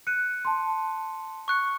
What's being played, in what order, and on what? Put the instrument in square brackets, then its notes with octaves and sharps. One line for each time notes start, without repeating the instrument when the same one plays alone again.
[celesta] F#6 [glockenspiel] C#7 D#7
[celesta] A5 C6
[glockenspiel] C#6 F#6 C#7